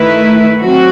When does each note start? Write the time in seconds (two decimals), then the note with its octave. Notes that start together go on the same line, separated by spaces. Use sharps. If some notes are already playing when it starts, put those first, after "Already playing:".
Already playing: D#3 A3 E4 B4
0.60 F#3 C4 F#4